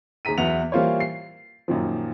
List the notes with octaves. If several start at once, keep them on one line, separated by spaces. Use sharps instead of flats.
D#2 G#4 A#5 B6 D#7
E2 F#3 B3 E4 F#5 F7
E3 G3 A#3 F4 C5 C#5
C7
F#2 A#2 D#3 F3